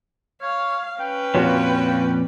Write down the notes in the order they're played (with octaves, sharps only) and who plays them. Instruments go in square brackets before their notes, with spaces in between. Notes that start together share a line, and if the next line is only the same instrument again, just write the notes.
[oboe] C#5 [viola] F5
[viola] C#4 B4 [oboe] G5
[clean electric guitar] F2 A#2 [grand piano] F4 F#4 C#5